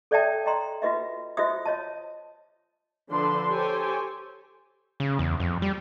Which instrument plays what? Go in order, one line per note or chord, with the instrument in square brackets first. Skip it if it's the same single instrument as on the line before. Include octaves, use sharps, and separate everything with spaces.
[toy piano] A4 C#5 D5 E5 G5 A5
D#5 G5 A#5 C6
F4 F#4 B4 D#5 E5
F4 F#4 C5 D#5 E5 D#6
C#5 D#5 A5
[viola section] D3 F3 D4 A4 B4 C6
G4 A4 C5 C#5 G#5
[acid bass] C#3
E2
F2
G3